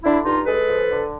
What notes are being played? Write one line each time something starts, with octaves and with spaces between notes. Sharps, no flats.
D3 D4 E4
G2 D#4 F4
G#3 A4 B4
F3
D3